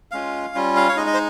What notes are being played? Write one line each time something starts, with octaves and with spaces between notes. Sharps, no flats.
G#3 C#4 F4 F5
G3 C#4 F4
F5
C#5
G#3 D#4 D#5
D#5
C5